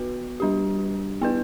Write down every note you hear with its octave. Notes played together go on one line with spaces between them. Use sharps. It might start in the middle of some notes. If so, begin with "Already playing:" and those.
Already playing: B3 F#4 B4
G3 D4 G4
B3 E4 B4